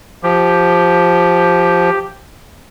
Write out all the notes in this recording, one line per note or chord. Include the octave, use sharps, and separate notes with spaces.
F3 G4